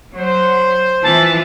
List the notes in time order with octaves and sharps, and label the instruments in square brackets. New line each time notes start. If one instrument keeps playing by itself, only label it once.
[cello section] F#3 [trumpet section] C5
[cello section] E3 F3 [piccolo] A5